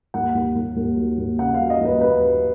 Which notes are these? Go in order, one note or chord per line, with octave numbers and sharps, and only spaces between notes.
D#2 F#5
D#2
D#2
D#2
F#3
D#2
C#3 F#5
F#3 F5
D#5
D#2
B4
D#2 B4
F#3